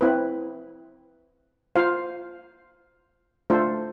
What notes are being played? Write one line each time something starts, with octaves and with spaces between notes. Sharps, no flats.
C4 E4 B4
F4 C5 F5
A3 D4 F4 A4 C5